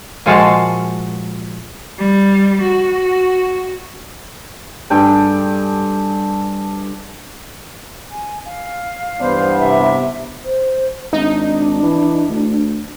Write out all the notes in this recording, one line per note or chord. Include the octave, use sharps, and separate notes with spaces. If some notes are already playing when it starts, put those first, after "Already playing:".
A#2 F3 G#3 F#4 F5 A5
G3
F#4
G2 A4 G5 G#5
G#5
F5
G2 E3 B3 D4 E4 C5
C3 E5
C5
G#1 D4 D#4
E3
D2